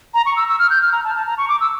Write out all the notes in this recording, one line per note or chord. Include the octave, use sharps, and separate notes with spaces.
A#5
C#6
E6
E6
F6
G6
F6
A#5
A5
A5
A#5
C#6
D6
E6